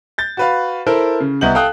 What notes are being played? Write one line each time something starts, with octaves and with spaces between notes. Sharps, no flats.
G6 A6
F#4 B4 F5
E4 A4 A#4 C5
C#3
C2 B3 D#5 G6 F#7
A4 F5 G5 D#6 F#6